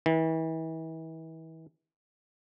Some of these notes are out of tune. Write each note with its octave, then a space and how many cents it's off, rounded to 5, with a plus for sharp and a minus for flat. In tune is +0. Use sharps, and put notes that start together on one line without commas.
E3 -35